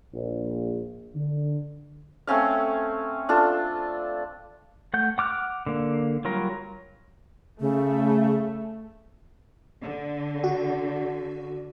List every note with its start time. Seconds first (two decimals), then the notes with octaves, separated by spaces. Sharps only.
0.13 A#1
1.15 D3
2.27 A3 C4 C#4 F5
3.29 D4 F4 A4
4.94 A3 F#5 G6
5.18 F#5 D6 F6 F#6
5.66 D3 A#3
6.25 F#3 G3 F4 A#4
7.60 C#3 A3
9.81 D3
10.44 F#4